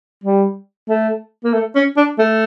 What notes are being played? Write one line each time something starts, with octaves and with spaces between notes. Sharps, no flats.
G3
A3
A#3
A3
C#4
D4
A3